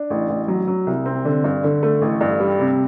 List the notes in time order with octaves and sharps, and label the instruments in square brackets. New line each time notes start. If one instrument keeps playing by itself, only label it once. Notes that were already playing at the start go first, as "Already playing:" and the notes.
Already playing: [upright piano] D4
A1
A1
F#3
F#3
C2
C4
D3
G2
D3
A3
A1
G2
G3
C3